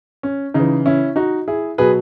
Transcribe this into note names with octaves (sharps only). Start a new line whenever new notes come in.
C#4
C#3 E3 D#4
C#4 E4
D#4 F#4
E4 G#4
B2 F#3 G#4 B4